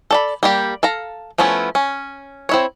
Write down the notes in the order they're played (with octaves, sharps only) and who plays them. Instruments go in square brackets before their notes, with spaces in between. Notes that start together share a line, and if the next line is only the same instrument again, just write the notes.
[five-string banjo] A4 D5 B5
G3 A#3 G4
A4 F5 A#5
F3 A3 B3 C#4 E4
C#4
C4 E4 C#5